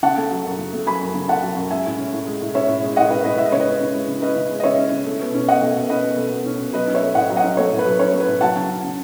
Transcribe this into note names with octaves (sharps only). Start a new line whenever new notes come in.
C#3 F#5 A5
A3
F#3
F#2
C#3
A3
F#3 G#5 B5
F#2
C#3
A3 F#5 A5
F#3
F#2
G#3 E5 G#5
A2
C#4
A2
G#3
A2
C#4 C#5 E5
A2
G#3
A2 D#5 F#5
C#4 B4 D#5
A2 B4 D#5
G#3 E5
D#5
C#3 C#5
B4 D#5
C#4
C#3
G#3
C#3
C#4 B4 D#5
C#3
G#3
D#5
C#3 C#5 E5
C#4
C#3
A3
B2
C#4
B2 D#5 F#5
A3
B2
C#4 B4 D#5
B2
A3
B2
C#4
B2
F#3 B4 D#5
C#4
C#5 E5
A3
A2 D#5 F#5
F#3
D#5 F#5
C#4
A3 C#5
A2
B4
F#3
C#4 C#5
A3
B4
A2
F#3 F#5 A5
C#3
C#4
C#3